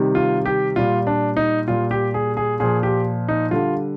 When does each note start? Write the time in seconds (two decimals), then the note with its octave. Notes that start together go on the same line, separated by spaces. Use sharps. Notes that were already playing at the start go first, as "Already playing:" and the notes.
Already playing: C3 D#3 G3
0.15 F4
0.46 G4
0.76 A#2 G3 F4
1.07 D4
1.37 D#4
1.68 A#2 G3 F4
1.91 G4
2.14 G#4
2.37 G#4
2.60 A#2 F3 G#4
2.83 G4
3.28 D#4
3.51 D3 G3 F4